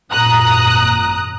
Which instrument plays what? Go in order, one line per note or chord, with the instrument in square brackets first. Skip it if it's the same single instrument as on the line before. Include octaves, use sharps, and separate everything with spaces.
[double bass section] G#1 F#2 A#2 [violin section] A#5 D#6 F#6